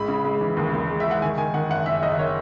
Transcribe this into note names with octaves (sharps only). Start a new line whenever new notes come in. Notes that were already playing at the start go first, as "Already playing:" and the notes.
Already playing: A1 G#3 B5
C#3
G#3
E3
D#2
D#2
G#3
E5
G#3
F#5
D#3 G#5
D#3 G#5
D#3 F#5
F#1 F#5
F#1 E5
F#1 D#5
D#3 C#5